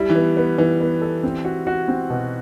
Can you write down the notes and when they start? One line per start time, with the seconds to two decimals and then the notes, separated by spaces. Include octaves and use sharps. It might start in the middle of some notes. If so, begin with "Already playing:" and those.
Already playing: G3 E4
0.09 E3
0.15 B3
0.37 B3
0.58 E3 B3
0.80 B3
1.01 A4
1.23 C4
1.45 F#4
1.67 F#4
1.88 C4
2.10 B2